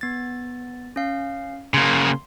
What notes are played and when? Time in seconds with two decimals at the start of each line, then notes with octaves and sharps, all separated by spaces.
0.01 B3 A6
0.96 C#4 F5
1.74 C#3 A#3 C6